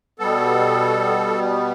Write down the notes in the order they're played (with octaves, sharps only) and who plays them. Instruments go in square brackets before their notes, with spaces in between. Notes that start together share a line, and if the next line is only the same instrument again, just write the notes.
[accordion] B2 G3 B3 A4